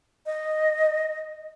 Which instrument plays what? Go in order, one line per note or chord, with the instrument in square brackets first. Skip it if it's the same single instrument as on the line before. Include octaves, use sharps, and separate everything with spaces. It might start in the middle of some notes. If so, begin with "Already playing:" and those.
[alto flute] D#5